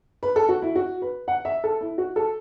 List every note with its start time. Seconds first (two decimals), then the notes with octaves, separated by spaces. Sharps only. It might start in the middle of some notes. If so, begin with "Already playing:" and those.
0.23 B4
0.36 A4
0.49 F#4
0.62 E4
0.76 F#4
1.02 B4
1.28 F#5
1.45 E5
1.64 A4
1.81 E4
1.98 F#4
2.16 A4